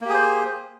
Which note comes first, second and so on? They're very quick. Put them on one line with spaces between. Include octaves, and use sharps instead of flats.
A#3 G4 G#4 C5